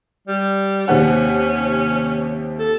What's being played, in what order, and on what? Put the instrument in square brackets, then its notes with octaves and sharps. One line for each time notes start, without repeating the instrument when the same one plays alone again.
[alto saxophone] G3
[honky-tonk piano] D#2 C3 F#5 [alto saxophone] C#4
[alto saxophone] A4